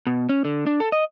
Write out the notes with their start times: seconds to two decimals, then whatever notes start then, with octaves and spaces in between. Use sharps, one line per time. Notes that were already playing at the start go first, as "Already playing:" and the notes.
0.07 B2
0.29 C#4
0.45 D3
0.67 D4
0.80 A4
0.92 D#5